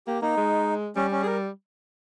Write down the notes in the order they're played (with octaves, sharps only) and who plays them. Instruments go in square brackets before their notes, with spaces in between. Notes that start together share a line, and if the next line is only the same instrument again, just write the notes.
[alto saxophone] A#3 [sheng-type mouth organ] G4
[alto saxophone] A#3 [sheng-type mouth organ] D#4
[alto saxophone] G#3
[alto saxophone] G3 [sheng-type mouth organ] C#4
[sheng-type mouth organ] C#4
G#4
A#4